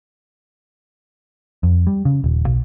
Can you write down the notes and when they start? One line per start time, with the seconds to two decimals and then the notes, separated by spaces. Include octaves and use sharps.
1.63 F2
1.87 G3
2.05 C#3
2.24 D#1
2.47 B1